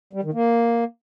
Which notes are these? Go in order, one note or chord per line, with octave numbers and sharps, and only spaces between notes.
G3
D#3
A#3